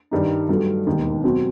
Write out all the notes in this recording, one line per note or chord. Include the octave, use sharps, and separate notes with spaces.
G2 D#3 G3 D#4
G2 F#3 A3
E1 D#2 D#3
B2 F#3 C4